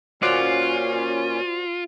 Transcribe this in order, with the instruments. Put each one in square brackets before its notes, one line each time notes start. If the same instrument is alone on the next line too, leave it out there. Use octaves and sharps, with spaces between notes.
[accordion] A#2 C#4 [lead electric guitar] F4 [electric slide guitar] F#4 C5 D5